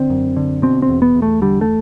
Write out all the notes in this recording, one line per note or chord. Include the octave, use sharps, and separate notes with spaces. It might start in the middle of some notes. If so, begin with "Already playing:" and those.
Already playing: D3 C4
F#2
D3
B2 C4
C4
E2
B3
E2
A3
D3 G3
A3